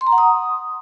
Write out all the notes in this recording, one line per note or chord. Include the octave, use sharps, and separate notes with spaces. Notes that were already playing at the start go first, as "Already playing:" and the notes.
C6
A#5
F#5
D#6